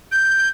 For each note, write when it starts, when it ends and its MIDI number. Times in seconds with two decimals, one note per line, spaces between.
0.12 0.48 91